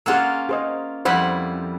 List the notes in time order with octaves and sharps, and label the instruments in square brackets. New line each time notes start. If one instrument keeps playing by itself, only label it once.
[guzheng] A#3 C#4 F4 [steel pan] G#4 F#5 E6
[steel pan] G#4 C5 D#5
[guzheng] F2 G3 E4 [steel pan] C5 F#5 B5